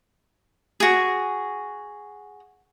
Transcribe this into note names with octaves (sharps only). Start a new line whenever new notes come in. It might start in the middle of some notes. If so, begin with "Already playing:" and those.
F#4 G#4